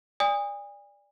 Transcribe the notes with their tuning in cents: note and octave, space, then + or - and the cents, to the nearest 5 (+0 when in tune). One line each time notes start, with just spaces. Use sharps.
D5 +0 G#5 -35 D#6 +0